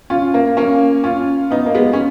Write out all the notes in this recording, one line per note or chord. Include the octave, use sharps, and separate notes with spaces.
C#4 F4
A#3
A#3 C#4
C#4 F4
B3 D#4
A#3
G#3 B3
C#4